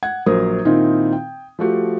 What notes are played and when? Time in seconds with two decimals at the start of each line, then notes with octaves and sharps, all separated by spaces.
0.03 F#5 G#6
0.26 A#1 F#3 A#4 C5 D#6
0.65 A#2 D#3 C4 D#4 E4
1.12 G5
1.59 F3 A3 F#4 G4